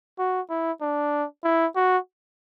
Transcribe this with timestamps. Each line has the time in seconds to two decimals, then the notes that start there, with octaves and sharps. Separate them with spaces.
0.19 F#4
0.50 E4
0.81 D4
1.44 E4
1.76 F#4